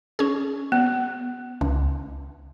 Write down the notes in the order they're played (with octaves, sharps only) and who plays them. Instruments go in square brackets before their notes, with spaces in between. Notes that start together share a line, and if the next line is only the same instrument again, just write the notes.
[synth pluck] C#4 G#4
[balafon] B3
[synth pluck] C#2